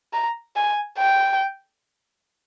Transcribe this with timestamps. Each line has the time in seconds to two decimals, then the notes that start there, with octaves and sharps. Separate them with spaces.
0.13 A#5
0.56 G#5
0.99 G5